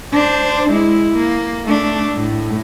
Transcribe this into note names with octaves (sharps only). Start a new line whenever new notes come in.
D4 C5
G#3 E4
A#3
A3 D4
A2